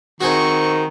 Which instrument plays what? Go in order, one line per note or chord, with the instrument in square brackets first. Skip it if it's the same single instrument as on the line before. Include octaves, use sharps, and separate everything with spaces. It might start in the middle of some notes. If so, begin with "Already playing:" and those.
[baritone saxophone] D#3 [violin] C4 C#6 [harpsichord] F#4 G#4 C5